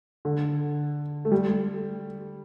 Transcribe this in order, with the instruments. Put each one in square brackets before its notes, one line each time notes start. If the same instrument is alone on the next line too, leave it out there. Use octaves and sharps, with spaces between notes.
[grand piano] D3
A3
G3